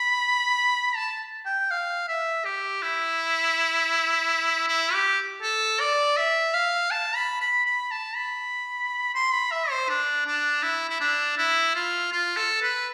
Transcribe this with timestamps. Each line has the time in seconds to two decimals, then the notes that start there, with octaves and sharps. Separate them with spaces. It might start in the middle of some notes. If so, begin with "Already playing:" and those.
Already playing: B5
0.96 A5
1.46 G5
1.71 F5
2.08 E5
2.45 G4
2.82 E4
4.68 E4
4.93 G4
5.42 A4
5.80 D5
6.17 E5
6.54 F5
6.91 A5
7.16 B5
7.41 B5
7.66 B5
7.91 A5
8.15 B5
9.14 C6
9.33 B5
9.51 E5
9.70 C5
9.89 D4
10.26 D4
10.63 E4
10.89 E4
11.00 D4
11.37 E4
11.75 F4
12.12 F4
12.37 A4
12.62 B4